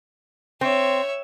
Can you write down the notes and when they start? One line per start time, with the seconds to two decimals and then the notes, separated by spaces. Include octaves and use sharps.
0.61 C4 C#5 E5